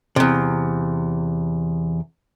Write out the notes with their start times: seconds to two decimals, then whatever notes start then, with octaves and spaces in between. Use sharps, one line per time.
0.16 E2 C3